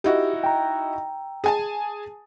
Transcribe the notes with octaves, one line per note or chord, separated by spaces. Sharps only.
D#4 E4 F#4 G4
G5 A#5
G#4 G#5 A5